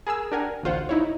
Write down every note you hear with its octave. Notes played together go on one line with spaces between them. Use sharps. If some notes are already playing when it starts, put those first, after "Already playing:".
G#4 A#4 G#5 E6
D4 G4 A#4 F#5 G#5
A1 D2 F4 C5 F#5
D#4 E4 C#5